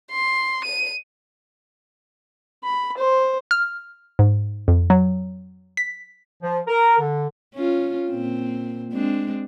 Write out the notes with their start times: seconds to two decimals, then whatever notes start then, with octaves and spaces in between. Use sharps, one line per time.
0.11 C6
0.65 D#7
2.63 B5
2.98 C5
3.51 F6
4.19 G#2
4.68 F2
4.90 F#3
5.77 B6
6.43 F3
6.67 A#4
6.99 D3
7.54 C#4 F4
8.10 A#2 C4
8.92 G#3 C4 D4